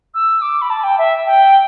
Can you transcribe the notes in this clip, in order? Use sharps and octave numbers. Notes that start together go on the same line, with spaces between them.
E6
D6
B5
A5
G5
E5
G5